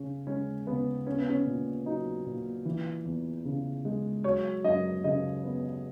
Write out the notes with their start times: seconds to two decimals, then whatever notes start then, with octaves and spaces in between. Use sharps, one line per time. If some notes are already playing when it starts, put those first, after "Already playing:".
Already playing: C#3 C#4
0.27 G#3 C#4
0.67 C#3 B3
1.06 B3 C#4
1.18 B3
1.30 C#4
1.46 A#2
1.86 F#3 D#4
2.26 A#2
2.65 E3
3.05 E2
3.45 C#3
3.85 G#3
4.24 F#3 C#5
4.64 F#2 D#5
5.04 C#3 D#5
5.44 B3